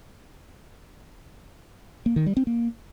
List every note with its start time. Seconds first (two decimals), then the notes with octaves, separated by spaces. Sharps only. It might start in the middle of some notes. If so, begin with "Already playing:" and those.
2.06 A#3
2.16 D#3
2.26 G3
2.37 C4
2.47 A#3